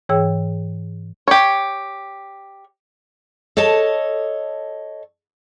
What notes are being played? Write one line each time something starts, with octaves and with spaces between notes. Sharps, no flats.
G#2 E3 G#4 C#5 G5 E6
G4 C#5
A4 C#5 D#5 A5